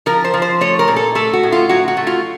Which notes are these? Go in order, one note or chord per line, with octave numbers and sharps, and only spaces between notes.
F3 A#4
C5
F3
C5
A3 C#5
A#4
A#2
A4
A3 A4
F#4
A2
F4
F#3 F#4
F#4
A3
F4